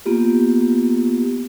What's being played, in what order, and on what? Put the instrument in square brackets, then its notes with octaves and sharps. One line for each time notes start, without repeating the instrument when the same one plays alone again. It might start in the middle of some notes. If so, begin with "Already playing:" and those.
[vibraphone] A#3 B3 F4 G4